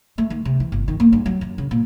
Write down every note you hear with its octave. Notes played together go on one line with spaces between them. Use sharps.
A3
D#3
C3
E3
G1
D#3
A#3
G2
F#3
F#2
C#3
A#2